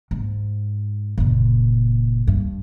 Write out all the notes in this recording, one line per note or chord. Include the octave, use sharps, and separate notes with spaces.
G#2
F#1 A#2
G2